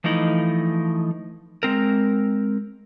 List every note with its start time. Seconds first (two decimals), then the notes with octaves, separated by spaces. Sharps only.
0.04 E3 F3 A3 D#4 E4
1.63 G#3 C4 A#4